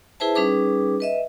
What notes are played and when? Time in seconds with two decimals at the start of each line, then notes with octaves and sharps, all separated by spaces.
0.20 E4 G#4 B4 C5 E5 A5
0.35 G3 C#4 D#4 G#4 B4 D6
1.00 B4 D#5 E5